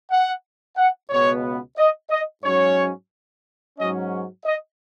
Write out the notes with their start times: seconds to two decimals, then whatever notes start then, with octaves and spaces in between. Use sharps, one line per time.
0.10 F#5
0.77 F#5
1.10 C#2 B2 B3 C#5
1.78 D#5
2.10 D#5
2.44 G#2 F#3 C#4 C#5
3.78 G#2 F#3 C#4 D#5
4.45 D#5